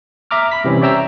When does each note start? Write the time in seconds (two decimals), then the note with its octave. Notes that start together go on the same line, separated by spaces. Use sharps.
0.31 E5 A#5 D6 F6
0.52 B5 B6
0.64 C3 E3 G3 C4 C#4
0.81 C#5 D5 E5 G5 A#5 E6